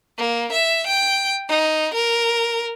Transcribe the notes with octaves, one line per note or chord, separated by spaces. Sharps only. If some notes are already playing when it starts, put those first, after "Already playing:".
A#3
E5
G5
D#4
A#4